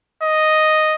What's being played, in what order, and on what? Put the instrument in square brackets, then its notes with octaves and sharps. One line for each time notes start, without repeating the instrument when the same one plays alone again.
[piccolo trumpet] D#5